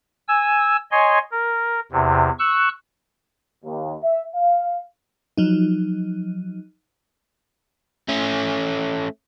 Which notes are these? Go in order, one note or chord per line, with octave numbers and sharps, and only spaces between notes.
G#5 E6
C#5 D#5 G#5 C6
A#4
E2 C3
C#6 E6 F#6
D#2
E5
F5
F3 F#3 D#4
A3 C#4